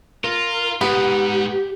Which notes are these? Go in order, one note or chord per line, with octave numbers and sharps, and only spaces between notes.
F4 A#4
G#2 B3 G4